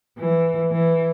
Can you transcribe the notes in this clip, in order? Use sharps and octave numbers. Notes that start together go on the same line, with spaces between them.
E3
E3